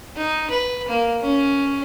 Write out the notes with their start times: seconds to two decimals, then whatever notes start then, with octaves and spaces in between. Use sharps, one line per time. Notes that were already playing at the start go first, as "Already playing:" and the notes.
0.17 D#4
0.50 B4
0.88 A#3
1.22 C#4